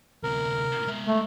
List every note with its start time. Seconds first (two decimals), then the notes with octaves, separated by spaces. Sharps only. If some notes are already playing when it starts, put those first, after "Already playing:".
0.23 D2 C3 A#4
0.87 G#3 E5
1.07 A3